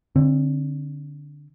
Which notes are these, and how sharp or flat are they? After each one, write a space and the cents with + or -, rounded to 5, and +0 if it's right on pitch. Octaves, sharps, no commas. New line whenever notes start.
D3 +0 C4 +25